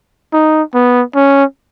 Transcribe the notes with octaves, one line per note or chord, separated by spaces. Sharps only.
D#4
B3
C#4